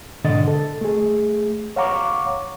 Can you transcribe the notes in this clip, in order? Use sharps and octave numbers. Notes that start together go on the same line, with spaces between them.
G#2 B2 D3 D#5 A6
A4
A3 G#4
C#5 F5 F#5 A#5 C#6 D6